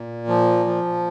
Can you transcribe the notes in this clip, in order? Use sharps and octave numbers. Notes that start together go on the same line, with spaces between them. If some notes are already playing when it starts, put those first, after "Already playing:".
Already playing: A#2
F3
F3